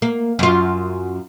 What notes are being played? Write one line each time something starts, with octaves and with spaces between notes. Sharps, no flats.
A#3
F#2 F4